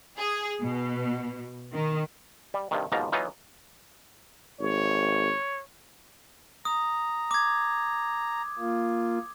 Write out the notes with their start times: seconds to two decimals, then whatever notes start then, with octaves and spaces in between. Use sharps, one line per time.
0.19 G#4
0.62 B2
1.73 D#3
2.54 G3
2.71 G2 C3 D#3
2.92 D#2 G#2 B2 F3 A#5
3.12 E3 F#3 B3 D#4 F4
4.60 G#1 C#5
6.65 A#5 D#6
7.31 D6 G#6
8.58 A#3 F4